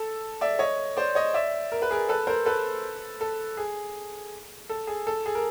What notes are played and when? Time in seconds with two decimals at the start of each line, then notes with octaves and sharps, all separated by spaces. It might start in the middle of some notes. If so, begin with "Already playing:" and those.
Already playing: A4
0.41 D5 E5
0.59 C#5 D#5
0.97 C5 D5
1.15 C#5 D#5
1.34 D5 E5
1.72 A#4
1.82 B4
1.91 G#4 A#4
2.09 A4 B4
2.27 A#4 C5
2.46 A4 B4
3.21 A4
3.57 G#4
4.70 A4
4.87 G#4
5.07 A4
5.26 G#4
5.35 A#4